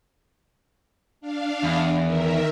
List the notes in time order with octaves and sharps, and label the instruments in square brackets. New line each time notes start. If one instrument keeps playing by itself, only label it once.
[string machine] D4 F5
[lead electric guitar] E2
[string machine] D#3 A#4 E5